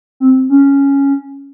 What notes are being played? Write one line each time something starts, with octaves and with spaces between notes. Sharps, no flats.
C4
C#4